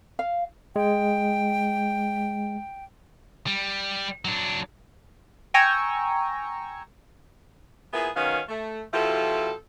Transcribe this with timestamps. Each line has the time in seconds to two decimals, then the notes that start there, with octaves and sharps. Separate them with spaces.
0.19 F5
0.76 G#3 G5
3.47 G3
4.25 F#3 D4
5.54 G5 G#5 A#5 C#6 E6
7.93 A#2 B3 E4 G#4
8.15 F#2 D#3 B3 C#4 F5
8.48 A3
8.93 B2 F3 E4 F4 G4 A4